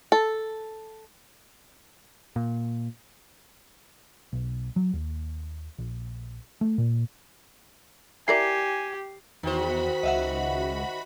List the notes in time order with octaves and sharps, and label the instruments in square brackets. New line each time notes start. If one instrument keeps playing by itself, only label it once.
[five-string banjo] A4
[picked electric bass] A#2
B1
F#3
D#2
A#1
A3
A#2
[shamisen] E4 A#4 D5 [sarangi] G4 [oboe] G#5 [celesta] C7
[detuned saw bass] E2 [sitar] D#3 C5 [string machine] F#4 B5
[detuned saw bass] C#2 [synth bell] D#5 E5 F#5